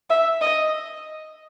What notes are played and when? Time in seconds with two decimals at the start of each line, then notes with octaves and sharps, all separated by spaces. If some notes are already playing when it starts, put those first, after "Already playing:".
0.10 E5
0.41 D#5